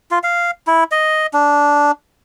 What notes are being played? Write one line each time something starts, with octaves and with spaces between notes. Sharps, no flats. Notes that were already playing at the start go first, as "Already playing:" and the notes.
F4
F5
E4
D#5
D4